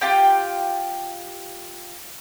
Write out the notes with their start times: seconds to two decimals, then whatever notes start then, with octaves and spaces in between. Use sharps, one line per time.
0.01 F4 G4 G5